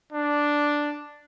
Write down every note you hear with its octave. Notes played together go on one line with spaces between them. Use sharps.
D4